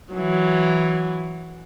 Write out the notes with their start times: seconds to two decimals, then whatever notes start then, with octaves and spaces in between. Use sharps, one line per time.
0.13 E3 F#3